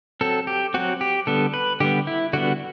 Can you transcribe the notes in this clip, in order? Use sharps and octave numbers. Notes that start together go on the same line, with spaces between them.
F#3 C4 A4
G4
F#3 C4 F#4
G4
D3 G3 B3 A4
B4
D3 G3 B3 G4
E4
D3 G3 B3 F#4